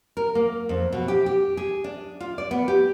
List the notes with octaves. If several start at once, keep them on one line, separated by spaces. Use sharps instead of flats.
A#4
A#3
F2
B2
G4
G4
G#4
D4
F4
D5
B3
G4